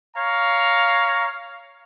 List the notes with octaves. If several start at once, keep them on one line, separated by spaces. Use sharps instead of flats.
C#5 F5 A#5